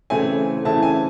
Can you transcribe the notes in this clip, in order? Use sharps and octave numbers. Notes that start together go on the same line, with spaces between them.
C#3 E3 A3 C4 E4 G#5
C#3 E3 A3 C4 E4 A5
G#5